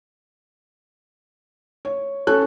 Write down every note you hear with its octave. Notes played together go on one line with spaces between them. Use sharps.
C#5
C#4 A4 F#6